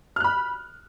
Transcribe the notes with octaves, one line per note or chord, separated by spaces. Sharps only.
B5 F6 F#6